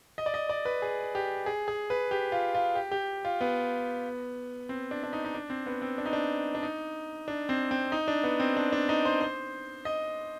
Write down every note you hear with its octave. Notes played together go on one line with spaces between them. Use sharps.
D#5
D5
D#5
D5
B4
G#4
G4
G#4
G#4
B4
G4
F4
F4
G4
G4
F4
B3
C4
D4
D4
D#4
D#4
D4
C4
B3
C4
D4
D#4
D4
D4
D#4
D4
C4
C4
D#4
D4
B3
C4
D4
D4
D#4
C5
C5
D#5